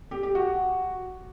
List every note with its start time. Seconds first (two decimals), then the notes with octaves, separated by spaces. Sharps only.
0.11 G4
0.23 G4
0.35 F#4